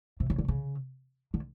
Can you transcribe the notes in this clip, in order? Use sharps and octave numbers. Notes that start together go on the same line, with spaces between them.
C3
C#3
D3
C#3
D3